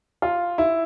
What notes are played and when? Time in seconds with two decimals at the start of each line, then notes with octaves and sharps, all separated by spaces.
0.22 F4
0.58 E4